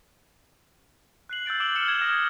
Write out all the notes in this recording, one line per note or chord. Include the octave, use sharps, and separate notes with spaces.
F#6 C7 F#7
E6 G6 A6 D7
D6 E6 G#6 D7 F#7 G7
F6 C#7 E7 F#7
G#6
D#6 F6 A#6 D7 F#7 G7